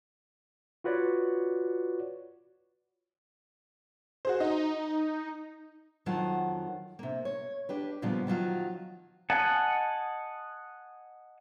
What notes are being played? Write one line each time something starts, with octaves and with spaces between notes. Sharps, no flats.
F4 F#4 B4 C#5 D5
F#4 G#4 C5
D#4 D#5
F2 D#3 F#3 F4 F#5 A5
C3 A#3
C#5
D4 G4 B4
A#2 C#3 F3 G3 B3
D#3 F3 F#3 F4
D#5 F#5 G#5 A5